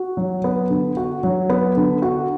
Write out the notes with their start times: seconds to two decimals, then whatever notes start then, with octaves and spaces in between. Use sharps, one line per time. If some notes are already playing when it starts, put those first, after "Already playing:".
Already playing: F#4
0.17 F#3
0.44 B3
0.70 D3
0.97 F#4
1.23 F#3
1.49 B3
1.77 D3
2.02 F#4